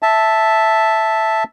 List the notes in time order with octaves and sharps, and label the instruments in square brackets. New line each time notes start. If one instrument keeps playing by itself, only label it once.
[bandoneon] E5 A5